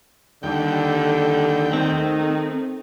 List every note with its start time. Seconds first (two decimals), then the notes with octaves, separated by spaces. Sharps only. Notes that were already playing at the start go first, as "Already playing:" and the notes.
0.43 D#2 D3 G3 G4 A4 G5
1.73 D#3 A3 C4 D#4